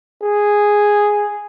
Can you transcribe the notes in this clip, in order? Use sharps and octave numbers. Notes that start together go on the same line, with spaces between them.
G#4